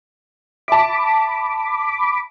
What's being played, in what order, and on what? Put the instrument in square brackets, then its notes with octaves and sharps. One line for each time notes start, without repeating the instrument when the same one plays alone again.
[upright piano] E5 A5 [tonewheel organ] B5 D6